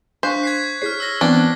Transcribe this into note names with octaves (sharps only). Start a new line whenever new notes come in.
D4 C5 F5 C#6 F#6 B6
G#6 B6 C7
E4 G#4 C#5 F6 B6 C7
E6 A#6
E3 B3 C4 D4 G7